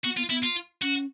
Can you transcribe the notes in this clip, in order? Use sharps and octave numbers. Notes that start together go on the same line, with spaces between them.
B3 F#4
B3 F4
B3 E4
F4
C#4 F#4